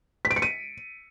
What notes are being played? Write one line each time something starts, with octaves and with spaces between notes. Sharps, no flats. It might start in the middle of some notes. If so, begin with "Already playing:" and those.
B6
D7
C#7
D#7